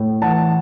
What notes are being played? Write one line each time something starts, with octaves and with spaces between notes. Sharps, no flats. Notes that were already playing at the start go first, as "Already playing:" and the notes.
Already playing: A2
E3 F#5 A5